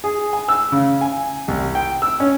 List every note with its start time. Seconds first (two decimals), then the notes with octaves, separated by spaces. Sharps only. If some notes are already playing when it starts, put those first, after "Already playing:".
0.04 G#4
0.33 G#5
0.49 E6
0.72 C#3
1.01 G#5
1.48 C2
1.75 G5
2.02 E6
2.20 C#4